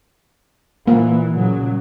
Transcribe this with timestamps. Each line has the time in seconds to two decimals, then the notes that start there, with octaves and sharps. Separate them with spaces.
0.87 A#2 E3 A#3
1.36 A#2 C#3 F#3